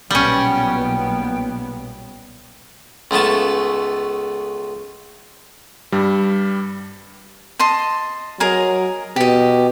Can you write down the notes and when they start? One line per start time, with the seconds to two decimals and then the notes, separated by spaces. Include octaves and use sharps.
0.11 B1 A#2 G3 B3 C#4 G5
3.11 C#2 C#3 A3 B3 A5
5.92 G2 G3
7.59 D#5 A5 C6
8.40 F#3 G#4 A#4 D#5
9.16 B2 G4 D#5